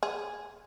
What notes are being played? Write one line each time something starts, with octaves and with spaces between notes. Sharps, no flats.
G#4